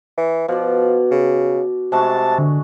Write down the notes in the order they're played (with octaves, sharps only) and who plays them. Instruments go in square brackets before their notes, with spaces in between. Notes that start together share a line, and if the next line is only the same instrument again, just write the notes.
[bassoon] E3
[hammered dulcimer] B2 D5 [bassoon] F3
[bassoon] C#3
[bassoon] C3 [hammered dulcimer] G#3 A3 F#4 [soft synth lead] A5
[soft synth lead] D3